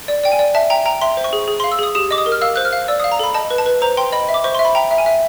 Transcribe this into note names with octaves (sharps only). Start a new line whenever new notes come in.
D5
D5 G5
G#5
D5
E5 A5
G5 A#5
G5 A#5
E5 C6
C5
C#6
G#4
G#4
F5 C6
E6
G#4 D#6
G4 D#6
D#5 D6
D#6
A#4
F6
F5 E6
C5 F#6
F6
F5
D5 E6
F5 D#6
A#5
A4 B5
D#5 A5
B4
A5
B4
C5 A#5
G5 C6
D#5 B5
E5
D6
C5 C#6
E5 C6
B5
G5 A#5
E5
G#5
E5